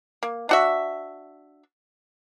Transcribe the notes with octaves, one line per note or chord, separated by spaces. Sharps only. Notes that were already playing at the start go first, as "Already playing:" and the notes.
A#3
D4 F#4 E5